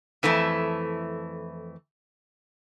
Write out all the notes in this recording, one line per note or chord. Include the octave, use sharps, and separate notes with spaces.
F2 E3 A3 E4